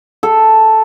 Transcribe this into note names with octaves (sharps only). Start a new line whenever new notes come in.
A4